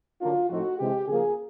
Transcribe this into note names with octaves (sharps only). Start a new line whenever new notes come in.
D3 F#3 A#3 D4 F4
A2 F3 A3 C4 D#4 F#4
C3 E3 G#3 G4
C#3 F3 A#3 G#4